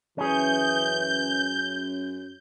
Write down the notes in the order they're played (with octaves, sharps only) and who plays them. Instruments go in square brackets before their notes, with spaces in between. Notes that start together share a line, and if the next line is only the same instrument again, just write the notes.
[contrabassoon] F#2 [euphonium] E3 [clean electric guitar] C#4 G#4 [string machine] G6